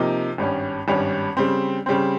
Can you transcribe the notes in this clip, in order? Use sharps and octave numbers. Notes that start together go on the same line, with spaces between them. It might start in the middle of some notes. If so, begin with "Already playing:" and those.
Already playing: C3 F3 A#3 D#4
G#1 G2 G3 C#4
G#1 G2 G3 C#4
C#3 G3 C4
C#3 G3 C4